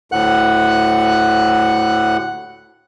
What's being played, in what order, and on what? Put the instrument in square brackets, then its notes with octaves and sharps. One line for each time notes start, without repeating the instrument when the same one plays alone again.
[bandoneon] D2 A2 F#5 F#6